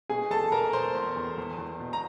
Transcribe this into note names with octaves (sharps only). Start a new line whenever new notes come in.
B2 G#4 G#5
E2 A4 A5
B2 A#4 A#5
B2 C5 C6
E2
E2
E2
E2
B2
A#5